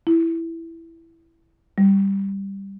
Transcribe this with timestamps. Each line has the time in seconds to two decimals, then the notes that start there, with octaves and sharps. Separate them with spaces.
0.07 E4
1.78 G3